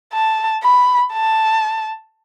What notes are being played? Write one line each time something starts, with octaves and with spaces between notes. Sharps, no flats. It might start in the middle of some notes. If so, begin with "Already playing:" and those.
A5
B5
A5